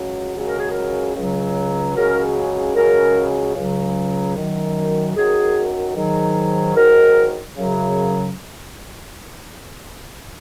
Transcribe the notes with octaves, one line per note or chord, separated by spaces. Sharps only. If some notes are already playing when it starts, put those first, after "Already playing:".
Already playing: C#2 C#3 F#3
C#2 C#3 F#3
A#4
G#4
A#4
C#2 C#3 F#3
C#2 C#3 F#3 A#4
C#2 C#3 F#3 A#4
C#2 C#3 F#3
F#2 D#3 F#3
F#2 D#3 F#3 G#4
G#2 D#3 F#3
G#2 D#3 F#3 A#4
F#2 C#3 F#3